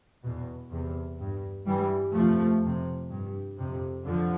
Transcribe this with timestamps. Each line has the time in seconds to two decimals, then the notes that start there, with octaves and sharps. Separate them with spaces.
0.23 E2 B2
0.71 E2 C3
1.19 G2
1.67 G2 E3 G3
2.15 F2 C3 F3 A3
2.62 F2 C3
3.10 G2
3.58 F2 C3
4.06 F2 D3 F3